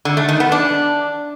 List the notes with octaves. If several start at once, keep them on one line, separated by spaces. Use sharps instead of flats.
D3
A3
D#3
B3
D4